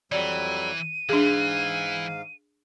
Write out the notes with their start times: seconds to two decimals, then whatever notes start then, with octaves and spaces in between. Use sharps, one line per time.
0.12 F2 E3 F#3 G3 D5 D#7
1.09 G#2 E3 D4 G#4 F5